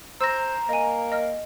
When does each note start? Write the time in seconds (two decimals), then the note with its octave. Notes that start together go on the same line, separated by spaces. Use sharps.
0.21 C5 A#5 E6 A#6
0.69 A#3 D#5 G#5
1.12 D#5 F6